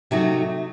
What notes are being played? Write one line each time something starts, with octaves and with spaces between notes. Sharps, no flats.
C3 F#3 A3 D#4 F#4